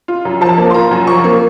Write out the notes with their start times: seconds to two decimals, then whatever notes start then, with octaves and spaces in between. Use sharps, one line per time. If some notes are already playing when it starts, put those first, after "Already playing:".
0.08 F4
0.25 F#2
0.41 F3 A5
0.58 A#3
0.70 C6
0.74 F4 A#5
0.91 F#2
1.07 F3 C#6
1.24 A#3